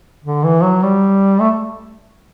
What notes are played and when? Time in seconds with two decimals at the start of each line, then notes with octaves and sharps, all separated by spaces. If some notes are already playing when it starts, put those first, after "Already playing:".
0.24 D3
0.44 E3
0.63 F#3
0.83 G3
1.40 A3